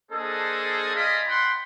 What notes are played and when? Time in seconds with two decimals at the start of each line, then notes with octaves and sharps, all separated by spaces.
0.12 A#3 D4 G#4 A4 C5 D#5
0.95 F4 D5 D#5 F5 G#5 B5
1.28 F#5 G5 B5 C6